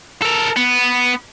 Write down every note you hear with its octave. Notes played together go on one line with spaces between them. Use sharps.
A4 A#4
B3